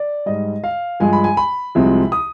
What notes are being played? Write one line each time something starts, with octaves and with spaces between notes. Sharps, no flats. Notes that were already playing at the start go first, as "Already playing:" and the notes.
Already playing: D5
G#2 G3 D#5
F5
G2 F3 G#3 G#5
B5
G#5
B5
C2 C3 F3 G#3
D#6